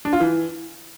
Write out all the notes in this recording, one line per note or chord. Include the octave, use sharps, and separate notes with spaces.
D4
F4
E3